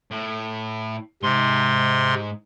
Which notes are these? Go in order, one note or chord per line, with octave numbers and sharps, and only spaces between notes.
A2
G#2 C3 C6